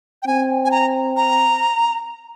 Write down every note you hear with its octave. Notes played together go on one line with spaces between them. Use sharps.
G5
C4 G#5
G#5
A#5
A#5